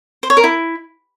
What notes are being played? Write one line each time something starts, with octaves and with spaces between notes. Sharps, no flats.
C5
C#5
A#4
E4